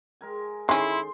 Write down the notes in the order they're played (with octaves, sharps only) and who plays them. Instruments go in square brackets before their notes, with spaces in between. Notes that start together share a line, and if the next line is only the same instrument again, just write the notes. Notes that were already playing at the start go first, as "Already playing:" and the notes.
[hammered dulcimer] G#3 A#4 G#5
[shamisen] D#3 C#4 [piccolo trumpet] E4 [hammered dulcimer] G#4 A4 C5 [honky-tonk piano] C6